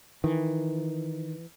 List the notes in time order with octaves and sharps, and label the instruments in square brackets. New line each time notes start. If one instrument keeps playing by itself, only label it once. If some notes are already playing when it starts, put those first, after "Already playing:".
[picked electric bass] D#3 [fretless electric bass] E3